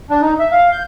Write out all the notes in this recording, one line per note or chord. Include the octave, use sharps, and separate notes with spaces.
D4
D#4
E5
F5
G6